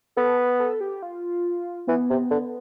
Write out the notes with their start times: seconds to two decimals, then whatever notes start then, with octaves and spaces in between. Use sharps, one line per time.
0.16 B3 A4
0.38 B4
0.60 A4
0.81 G4
1.02 F4
1.87 E3 B3
2.10 C3
2.30 D3